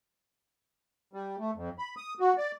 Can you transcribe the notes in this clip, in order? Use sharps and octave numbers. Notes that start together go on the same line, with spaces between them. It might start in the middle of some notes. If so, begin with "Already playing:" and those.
G3
A3
F2
B5
D#6
F#4
D5